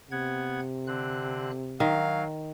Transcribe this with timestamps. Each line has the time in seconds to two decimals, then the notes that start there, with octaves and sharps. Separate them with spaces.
0.11 C3 B3 F#5 G#6
0.87 D3 C4 F#6
1.80 D#3 F#3 F5